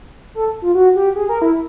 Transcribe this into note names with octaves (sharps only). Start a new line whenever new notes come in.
A4
F4
F#4
G4
G#4
A#4
E4